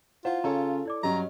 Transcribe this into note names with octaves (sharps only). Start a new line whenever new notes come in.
E4 F4 C5 F#5
C#3 A4 C#5 A#5
E4 D5 D6
G2 F#3 C#4 D#5 A#5